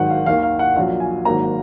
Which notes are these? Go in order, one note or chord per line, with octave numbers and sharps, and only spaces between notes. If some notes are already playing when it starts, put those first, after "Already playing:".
Already playing: G#1 G#2 D#3 F#3 F#5
F5
D#2 D#3 A#3 F5
F5
F#5
A#1 A#2 F#3 F5
G#5
G#1 G#2 F#3 A#3 A#5